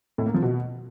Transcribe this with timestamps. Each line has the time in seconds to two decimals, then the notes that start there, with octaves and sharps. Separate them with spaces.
0.18 A2
0.26 A#3
0.34 F3
0.42 B2